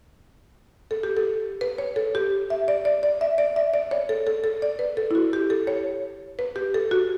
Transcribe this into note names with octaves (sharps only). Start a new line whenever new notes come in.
A4
G4
A4
B4
C#5
A4
G4
E5
D5
D5
D5
E5
D5
E5
D5
C#5
A4
A4
A4
D5
B4
A4
E4
F#4
G4
A4
C#5
B4
G4
A4
F#4